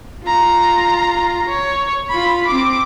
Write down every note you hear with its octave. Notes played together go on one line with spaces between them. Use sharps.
F4 A#5
C#5
F4 B5
C4 D6